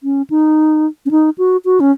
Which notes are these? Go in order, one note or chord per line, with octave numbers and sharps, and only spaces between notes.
C#4
D#4
C#4
D#4
F#4
F#4
C#4